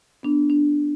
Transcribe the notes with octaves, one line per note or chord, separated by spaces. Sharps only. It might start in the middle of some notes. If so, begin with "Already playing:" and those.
B3 D4
D4